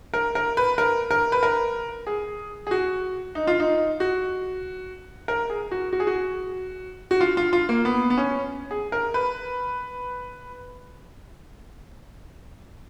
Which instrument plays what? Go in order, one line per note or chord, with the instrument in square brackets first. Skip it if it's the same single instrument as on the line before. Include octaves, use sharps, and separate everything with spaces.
[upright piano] A#4
A#4
B4
A#4
A#4
B4
A#4
G#4
G#4
F#4
D#4
F4
D#4
F#4
A#4
G#4
F#4
F#4
G#4
F#4
F#4
F4
F4
F4
A#3
B3
B3
C#4
G#4
A#4
B4